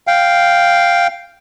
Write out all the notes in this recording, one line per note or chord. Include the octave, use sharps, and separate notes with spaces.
F5 G5